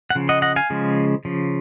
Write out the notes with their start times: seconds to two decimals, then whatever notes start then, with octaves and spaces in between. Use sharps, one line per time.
0.10 F#5
0.15 C#3 F3
0.29 D#5 F#5
0.42 D#5 F#5
0.56 F5 G#5
0.70 C#3 F3 G#3
1.25 C#3 F3